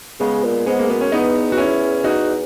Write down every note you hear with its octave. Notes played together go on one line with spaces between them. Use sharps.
C#3 G#3 B3
A#2
G#2 G#3 B3
A#3
F#2 B3
C#4
E2 B3 D#4
F#4
C#4 E4
D#4 F#4